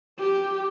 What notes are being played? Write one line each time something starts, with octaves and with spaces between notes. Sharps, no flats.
G4